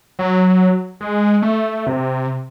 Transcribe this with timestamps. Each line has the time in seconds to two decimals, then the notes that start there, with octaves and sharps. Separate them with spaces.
0.19 F#3
1.01 G#3
1.42 A3
1.87 C3